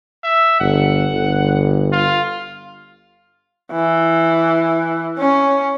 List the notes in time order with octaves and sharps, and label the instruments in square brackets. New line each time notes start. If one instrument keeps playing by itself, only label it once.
[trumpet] E5
[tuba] G1 [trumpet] F#5
[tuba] G1
[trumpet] F4
[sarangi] E3
C#4